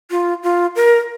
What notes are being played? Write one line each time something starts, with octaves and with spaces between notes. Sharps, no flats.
F4
F4
A#4